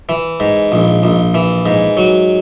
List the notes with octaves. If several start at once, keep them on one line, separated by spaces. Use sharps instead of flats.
E3
G#2
A#1
A#1
E3
G#2
F#3